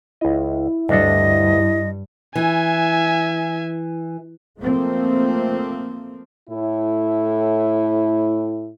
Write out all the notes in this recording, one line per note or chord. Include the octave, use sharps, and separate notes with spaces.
C#2 E4 D#5
D2 G2 D4 A4 D#5
E3 E5 G#5
F3 A3 A#3 C4
A2 E4